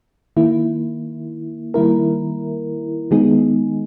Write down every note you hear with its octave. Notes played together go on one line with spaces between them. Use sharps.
D#3 A#3 E4
D#3 G3 A#3 E4 A#4
D#3 G#3 B3 D#4 G#4